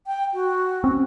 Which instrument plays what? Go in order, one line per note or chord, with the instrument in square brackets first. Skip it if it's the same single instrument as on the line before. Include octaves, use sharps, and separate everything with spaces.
[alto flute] G5
F#4
[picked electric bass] C4 C#4